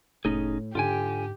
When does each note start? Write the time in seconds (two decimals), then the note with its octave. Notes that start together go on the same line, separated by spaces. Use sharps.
0.25 F1 A2 C#4 D#4 G#4
0.75 G#2 D3 F4 G4 G5 G#5